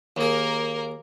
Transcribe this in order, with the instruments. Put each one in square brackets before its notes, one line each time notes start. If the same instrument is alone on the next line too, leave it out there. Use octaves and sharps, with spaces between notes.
[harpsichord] D#2 G#4 [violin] A#3 A#4